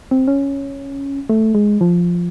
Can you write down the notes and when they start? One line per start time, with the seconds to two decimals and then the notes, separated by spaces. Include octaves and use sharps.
0.11 C4
0.27 C#4
1.29 A3
1.55 G#3
1.81 F3